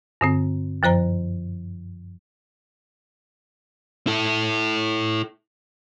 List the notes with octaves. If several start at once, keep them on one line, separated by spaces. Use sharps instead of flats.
G2 D3 C4
F#2 F3 C5 A#5
E4 A4